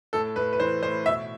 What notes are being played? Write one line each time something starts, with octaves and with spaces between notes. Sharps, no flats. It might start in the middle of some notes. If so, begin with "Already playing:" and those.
A2 A4
A2 B4
B4
E3 C5
A2 C5
B2 E5